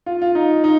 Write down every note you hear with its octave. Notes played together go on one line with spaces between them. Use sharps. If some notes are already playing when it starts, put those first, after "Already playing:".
F4
F4
D#4
D#4